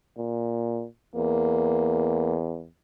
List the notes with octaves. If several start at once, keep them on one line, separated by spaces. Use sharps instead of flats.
A#2
E2 A#3